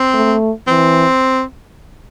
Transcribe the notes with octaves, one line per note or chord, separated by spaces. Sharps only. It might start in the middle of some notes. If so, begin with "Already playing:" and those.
Already playing: C4
A3
E3 C4